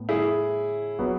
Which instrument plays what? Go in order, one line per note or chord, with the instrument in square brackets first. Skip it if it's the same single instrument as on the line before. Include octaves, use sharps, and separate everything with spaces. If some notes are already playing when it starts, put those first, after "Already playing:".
Already playing: [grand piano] A2 B3
[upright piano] E4 G#4
[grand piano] F#3 B3 F#4